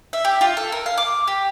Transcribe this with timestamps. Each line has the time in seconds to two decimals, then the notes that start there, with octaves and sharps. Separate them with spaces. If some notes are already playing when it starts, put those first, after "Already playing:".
0.13 E5
0.25 G4
0.41 F4
0.57 A4
0.72 A#4
0.86 F5
0.98 D6
1.27 G4